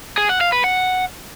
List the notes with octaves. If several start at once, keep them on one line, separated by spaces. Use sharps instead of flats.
G#4
F#5
F5
B4
F#5